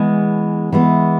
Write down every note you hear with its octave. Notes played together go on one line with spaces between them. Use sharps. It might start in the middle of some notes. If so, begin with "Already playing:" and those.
Already playing: E3 G#3 B3
E3 G#3 B3